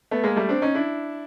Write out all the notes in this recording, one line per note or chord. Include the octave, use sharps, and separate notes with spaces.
A3 B3
G#3 A#3
G3 A3
C4 D4
C#4 D#4
D4 E4